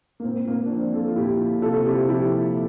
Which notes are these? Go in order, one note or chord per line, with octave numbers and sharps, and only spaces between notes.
A#3
A#2 C4
A#2 A#3
D4
F3 C4
F3 F4 A4
F4
A#2 E4 G4
A#2
C3 F4 A4
C3 E4 G4
F3 E4 G4